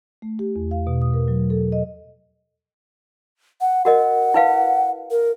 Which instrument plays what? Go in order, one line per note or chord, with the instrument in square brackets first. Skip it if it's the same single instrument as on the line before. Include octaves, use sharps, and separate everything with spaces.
[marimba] A3
G4
E2
F5
B2
D#6
A#4
F#3
A4
D#5
[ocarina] F#5
[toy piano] F#4 A#4 D#5 [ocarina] F#5
[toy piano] E4 B4 F5
[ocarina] A#4